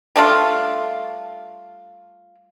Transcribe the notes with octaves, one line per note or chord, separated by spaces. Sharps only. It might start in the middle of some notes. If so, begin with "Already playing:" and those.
G3 A3 D4 F4